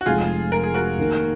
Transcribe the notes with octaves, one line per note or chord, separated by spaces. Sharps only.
F#4
F1 F2 F3 G#3 F4 G#4
A#4
G#4
F#4 A#4
D#2 D#3 A#3